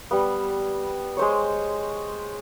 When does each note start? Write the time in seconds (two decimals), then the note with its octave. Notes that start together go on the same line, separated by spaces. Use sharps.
0.11 G3 B3
1.17 G#3 C5 C#5